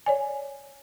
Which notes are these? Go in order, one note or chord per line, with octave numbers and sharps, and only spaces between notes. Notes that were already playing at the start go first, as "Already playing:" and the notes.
C#5 D5 G#5